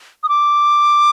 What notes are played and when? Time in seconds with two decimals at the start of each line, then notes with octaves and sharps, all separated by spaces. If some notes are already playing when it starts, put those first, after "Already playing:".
0.23 D#6
0.29 D6